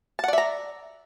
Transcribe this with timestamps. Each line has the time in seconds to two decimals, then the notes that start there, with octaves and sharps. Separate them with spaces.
0.19 A5
0.24 F#5
0.28 D5
0.33 E5
0.38 A#5